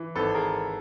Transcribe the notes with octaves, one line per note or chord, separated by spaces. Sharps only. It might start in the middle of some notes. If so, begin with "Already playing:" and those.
Already playing: E3
G#1 A4 B4
G#4 A#4